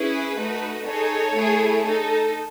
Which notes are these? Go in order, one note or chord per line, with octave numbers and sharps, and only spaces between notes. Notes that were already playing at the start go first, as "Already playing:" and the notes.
Already playing: C#4 E4 G#4 B4
A3 D#4 F#4
D#4 G#4 A4 C#5
A3 E4 G#4
D#4 A4